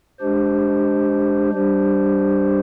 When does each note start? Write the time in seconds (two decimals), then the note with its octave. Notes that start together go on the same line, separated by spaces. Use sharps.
0.19 G#3 D4 G4 C5
1.52 G3 D4 G4 C5